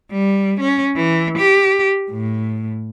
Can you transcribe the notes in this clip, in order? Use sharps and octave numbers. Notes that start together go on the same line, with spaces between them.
G3
C#4
E3
G4
A2